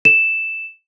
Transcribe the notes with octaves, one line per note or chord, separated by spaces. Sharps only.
E7